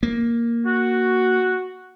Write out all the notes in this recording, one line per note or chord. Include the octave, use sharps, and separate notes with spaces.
A#3
F#4